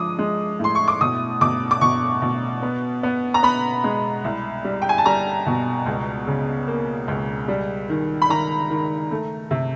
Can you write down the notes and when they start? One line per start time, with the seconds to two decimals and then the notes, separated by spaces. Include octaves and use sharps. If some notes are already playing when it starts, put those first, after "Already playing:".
Already playing: F3 G#3 D6 D#6
0.19 G#3
0.59 A2 C6
0.75 C#6
0.88 D6
1.01 B2 D#6
1.41 B2 D6
1.71 D6
1.81 B2 C#6
2.22 B2
2.62 B3
3.03 B3
3.34 A#5
3.43 B3 B5
3.84 G#3
4.24 C2
4.64 G3
4.82 G5
4.89 G#5
4.98 A5
5.05 G3 A#5
5.46 B2
5.86 C#2
6.27 C#3
6.68 A#3
7.08 C#2
7.48 G3
7.89 D#3
8.22 B5
8.29 D#3 A#5
8.70 D#3
9.11 A3
9.51 C3